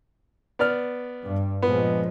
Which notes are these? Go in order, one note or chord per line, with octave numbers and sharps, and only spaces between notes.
B3 D5 F6
G2
A#2 F3 G#3 B3